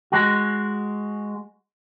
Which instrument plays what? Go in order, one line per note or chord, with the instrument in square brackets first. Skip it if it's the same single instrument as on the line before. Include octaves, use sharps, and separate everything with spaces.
[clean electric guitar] G#3 F#4